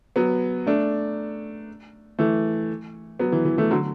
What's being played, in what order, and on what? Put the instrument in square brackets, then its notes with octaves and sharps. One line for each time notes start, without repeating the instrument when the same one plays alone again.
[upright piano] F#3 B3
A3 D4
E3 A3
F#3 B3
E3
E3
E3 A3
D3 F#3